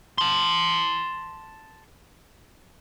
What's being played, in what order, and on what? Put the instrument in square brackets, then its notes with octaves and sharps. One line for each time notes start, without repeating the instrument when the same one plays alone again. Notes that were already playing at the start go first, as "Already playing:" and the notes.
[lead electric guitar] A5 C6